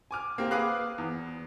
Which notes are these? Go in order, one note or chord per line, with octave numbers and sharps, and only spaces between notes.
G#5 D6 F6
A#3 C4 G4
G#4 B4 F5 D6 F6 F#6
E2